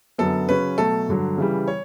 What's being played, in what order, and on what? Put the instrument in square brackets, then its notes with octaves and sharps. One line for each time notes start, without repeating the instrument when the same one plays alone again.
[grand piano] F#2 D3 F#3 B3 [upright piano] A4
[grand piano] C#3 F#3 C#4 [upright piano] B4
[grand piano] B2 F#3 A3 [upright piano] A4
[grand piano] G2 D3 F#3
C#3 E3 G3
[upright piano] C#5